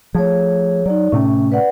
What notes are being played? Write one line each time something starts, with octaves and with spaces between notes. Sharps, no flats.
F3 A3 G#4 C#5
F#3 D#4 D5
A2 C3 A3 C#4
B4 D5 F#5